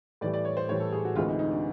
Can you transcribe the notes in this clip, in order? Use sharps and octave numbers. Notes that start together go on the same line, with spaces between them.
A2 E3 G3 D5
D5
C#5
C5
A2 E3 G3 C#5
A4
G#4
F#4
D2 C3 E3 G#3 F4
D#4
D#4
D4